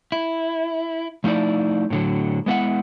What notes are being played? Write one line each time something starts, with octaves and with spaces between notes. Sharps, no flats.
E4
F3 A3 D#4 E4 D5
A2 D3 F#3
G#3 B3 E4 F#5